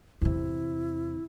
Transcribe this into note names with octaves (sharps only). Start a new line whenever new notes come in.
E2 C3 E4